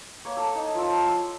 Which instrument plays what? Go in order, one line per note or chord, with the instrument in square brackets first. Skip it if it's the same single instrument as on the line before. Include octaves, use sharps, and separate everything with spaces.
[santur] A#3 C#5
A4
D#4
F3 E6
C6 E6